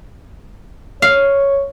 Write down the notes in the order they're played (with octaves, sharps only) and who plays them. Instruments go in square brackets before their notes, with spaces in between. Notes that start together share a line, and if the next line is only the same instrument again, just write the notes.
[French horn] C#5 [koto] F5